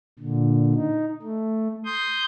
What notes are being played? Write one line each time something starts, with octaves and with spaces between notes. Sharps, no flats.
A#2 D3
D#4
A3
C6 D#6 G6